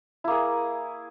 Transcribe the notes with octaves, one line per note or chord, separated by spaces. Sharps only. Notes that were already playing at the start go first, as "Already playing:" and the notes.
A#3 E4 G#4